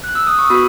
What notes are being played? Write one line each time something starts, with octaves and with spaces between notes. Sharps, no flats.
F#6
E6
D#6
C#6
B3 F#4 B5